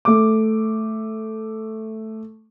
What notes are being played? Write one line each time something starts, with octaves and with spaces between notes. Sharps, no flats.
A3 D6